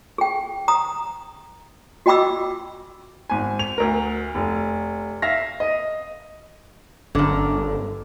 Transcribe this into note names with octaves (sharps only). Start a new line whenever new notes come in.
G#4 G5
A#5 D#6
F#4 D#5 G5 B5 D6 E6
G#1 G#5
F7
D2 A#4
F1
E5 F5 A#6
D#5
G1 F#2 D3